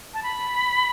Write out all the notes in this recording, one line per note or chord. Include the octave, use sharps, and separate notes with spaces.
A5
B5